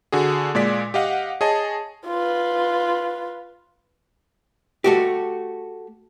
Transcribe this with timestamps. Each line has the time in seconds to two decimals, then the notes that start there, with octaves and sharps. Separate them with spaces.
0.12 D3 F#4 G#4
0.55 A#2 G#3 D5 B6
0.94 G4 D#5 F5 F#5
1.41 G#4 C#5 D#5 A5
2.07 F4 B4
4.84 A3 F#4 G4